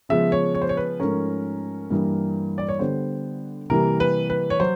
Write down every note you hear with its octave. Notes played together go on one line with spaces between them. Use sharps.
C#3 F3 G#3 B3 E5
C#5
C#5
C5
C#5
B4
G#2 F3 A3 C#4 A#4
G2 E3 G3 A#3
D5
C#5
D3 G3 B3 C5
C3 E3 G3 A#3 A#4
B4
B4
C#5
F#3 C5